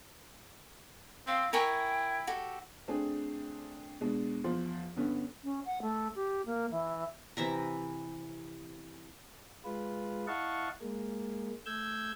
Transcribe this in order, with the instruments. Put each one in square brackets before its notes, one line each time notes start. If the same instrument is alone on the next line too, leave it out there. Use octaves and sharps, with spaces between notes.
[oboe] C4 [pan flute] F5
[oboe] E4 [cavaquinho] A#4 G#5 C#6 [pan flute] G5
[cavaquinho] F#4 G4 A4
[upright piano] A3 C4 D4 G#4
B2 G#3 D4
E2 F3 C6
G2 D3 B3 C#4
[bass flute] C#4
F#5
A3
G4
A#3
E3
[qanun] C3 E3 E5 A#5
[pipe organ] G#3 F4 B4
E4 D#5 F5 F#5 A5 C#6
G#3 A#3
A3 E6 G6 G#6